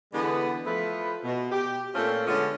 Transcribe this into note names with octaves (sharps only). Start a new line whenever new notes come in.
D3 E3 G#3 B3
F3 A3 B4
B2
G4
A#2 A3 C4 C#4 F4 A4
D3 G#3 A3 B3 C#4